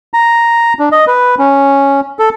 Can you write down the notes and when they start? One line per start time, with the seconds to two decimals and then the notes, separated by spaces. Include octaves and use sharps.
0.14 A#5
0.79 D4
0.92 D#5
1.07 B4
1.39 C#4
2.19 A4